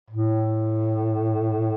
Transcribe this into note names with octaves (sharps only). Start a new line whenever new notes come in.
A2